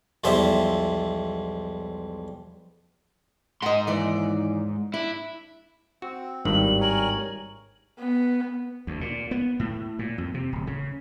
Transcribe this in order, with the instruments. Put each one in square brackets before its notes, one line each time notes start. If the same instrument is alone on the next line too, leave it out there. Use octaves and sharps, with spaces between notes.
[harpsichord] B1 E2 F3 G3 C5 E5
[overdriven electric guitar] G#2 C6 [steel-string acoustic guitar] D#5 F#5
[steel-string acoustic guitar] D#2 E3 D5
[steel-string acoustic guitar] D4 [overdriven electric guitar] E4
[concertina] C4 [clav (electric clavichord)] F#4
[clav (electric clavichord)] G#1 G2 D#3 [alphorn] G3 [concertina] B4 [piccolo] F#7
[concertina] A#4 C#5 G#5
[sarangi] B3
[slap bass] D2
A#2
B3
A2
A#2
F2
C3
D1
C#3